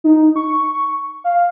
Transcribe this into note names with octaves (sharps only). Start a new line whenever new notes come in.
D#4
C#6
F5